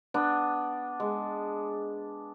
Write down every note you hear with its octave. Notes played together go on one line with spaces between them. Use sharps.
B3 D4
G#3